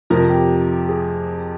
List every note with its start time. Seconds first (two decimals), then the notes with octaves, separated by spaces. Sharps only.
0.10 F2 C3 F3 A#4
0.29 G4
0.89 G#4